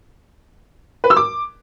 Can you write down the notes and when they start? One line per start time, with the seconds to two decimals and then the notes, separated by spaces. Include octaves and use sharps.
1.04 B4
1.10 E6
1.17 D6